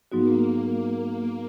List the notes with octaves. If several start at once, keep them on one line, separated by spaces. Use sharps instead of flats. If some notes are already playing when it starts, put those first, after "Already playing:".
G#2 F#3 A#3 B3 D#4 F#4